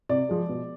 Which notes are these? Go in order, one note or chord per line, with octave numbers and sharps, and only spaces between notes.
C3 D5
F3 G#3
B2